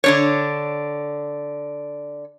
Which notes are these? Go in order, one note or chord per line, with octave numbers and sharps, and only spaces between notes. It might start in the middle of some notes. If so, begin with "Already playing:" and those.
D3 D4 C#5